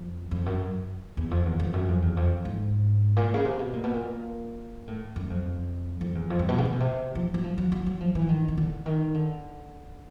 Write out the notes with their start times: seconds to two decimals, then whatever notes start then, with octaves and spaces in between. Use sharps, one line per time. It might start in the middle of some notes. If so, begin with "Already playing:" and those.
Already playing: F2
0.31 F2
0.46 F#2
1.17 E2
1.31 F2
1.45 E2
1.60 F2
1.73 F#2
1.88 F2
2.02 E2
2.17 F2
2.45 G#2
3.16 A#2
3.34 C#3
3.45 C3
3.59 B2
3.73 A#2
3.84 B2
3.94 A#2
4.87 A2
5.16 F#2
5.30 F2
6.01 F2
6.15 E2
6.30 F2
6.39 G2
6.48 B2
6.58 C#3
6.65 C3
6.72 B2
6.80 C3
7.15 F3
7.34 F#3
7.44 F3
7.58 F#3
7.72 F#3
7.86 F#3
8.00 F3
8.15 E3
8.29 D#3
8.48 D#3
8.57 D3
8.86 D#3
9.14 D3